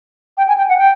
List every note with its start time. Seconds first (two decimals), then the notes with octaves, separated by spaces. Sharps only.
0.37 G5
0.48 G#5
0.58 G5
0.69 F#5
0.78 G5